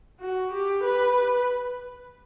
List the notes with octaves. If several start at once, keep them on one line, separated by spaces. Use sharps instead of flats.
F#4
G4
B4